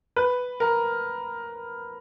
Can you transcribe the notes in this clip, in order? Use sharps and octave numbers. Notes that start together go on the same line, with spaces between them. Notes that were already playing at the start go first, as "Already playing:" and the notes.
B4
A#4